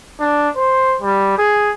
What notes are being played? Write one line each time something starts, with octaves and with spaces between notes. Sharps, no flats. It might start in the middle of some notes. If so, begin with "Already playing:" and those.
D4
C5
G3
G#4